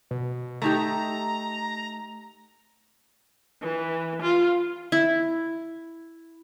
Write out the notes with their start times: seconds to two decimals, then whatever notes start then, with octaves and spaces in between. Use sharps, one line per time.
0.11 B2
0.62 A3 D#4 G4 A#5
3.62 E3
4.22 F4
4.92 E4